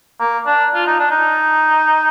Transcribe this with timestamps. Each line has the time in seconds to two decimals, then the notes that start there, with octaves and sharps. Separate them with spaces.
0.20 A#3
0.46 D4
0.75 F4
0.87 D#4
0.99 D4
1.11 D#4